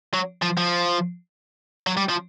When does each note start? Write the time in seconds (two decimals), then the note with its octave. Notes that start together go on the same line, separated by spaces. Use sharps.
0.13 F#3
0.42 F3
0.57 F3
1.87 F#3
1.97 G3
2.09 F3